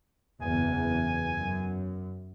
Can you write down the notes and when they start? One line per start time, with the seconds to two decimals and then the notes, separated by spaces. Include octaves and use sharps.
0.42 F#1 E2 G#5
1.32 F#2